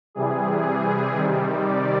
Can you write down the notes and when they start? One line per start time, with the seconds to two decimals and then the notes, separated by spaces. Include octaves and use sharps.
0.15 C3 E3 G3 G#4
1.13 C3 D#3 G3
1.63 D5